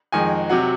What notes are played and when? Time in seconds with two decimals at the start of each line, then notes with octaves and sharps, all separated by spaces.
0.12 F2 D#3 G#3 G#5
0.50 C3 F#3 F#5